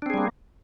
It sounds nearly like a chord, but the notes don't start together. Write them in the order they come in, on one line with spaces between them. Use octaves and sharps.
D4 C4 G#4 G3 A#3